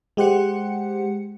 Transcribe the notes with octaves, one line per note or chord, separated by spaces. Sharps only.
G#3 G4 C5 F#5 C#7